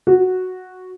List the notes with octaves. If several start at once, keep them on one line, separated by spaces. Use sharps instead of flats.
F#4